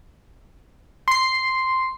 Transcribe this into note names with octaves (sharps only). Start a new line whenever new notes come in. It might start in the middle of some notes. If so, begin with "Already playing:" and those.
C6 C7